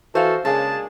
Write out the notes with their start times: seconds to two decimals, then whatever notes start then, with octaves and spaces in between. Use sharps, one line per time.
0.15 E3 F#4 A4 C5 F5
0.45 C#3 G#3 A#3 D4 G#4 A5